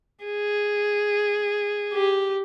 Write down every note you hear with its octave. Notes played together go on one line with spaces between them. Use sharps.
G#4
G4